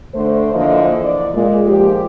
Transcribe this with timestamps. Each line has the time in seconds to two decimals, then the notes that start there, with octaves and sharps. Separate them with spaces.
0.14 D3 A3 C5
0.54 D3 E3 F3 A#3 D#5
1.04 D5
1.34 A#2 G#3
1.66 G#2 F3 G4